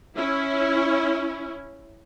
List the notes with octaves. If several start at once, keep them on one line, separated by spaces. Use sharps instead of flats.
C#4 E4